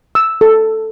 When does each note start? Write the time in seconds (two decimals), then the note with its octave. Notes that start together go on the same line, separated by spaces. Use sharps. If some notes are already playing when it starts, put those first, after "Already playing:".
0.15 E6
0.41 A4